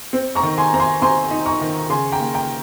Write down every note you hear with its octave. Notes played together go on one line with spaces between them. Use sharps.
C4
A#5 C#6
D#3
G#5 C6
C4 A#5
G#5 C6
C4 G#5 C6
D#4
A#5 C#6
D#3
C#3 G#5 C6
G5 A#5
A#3
G5 A#5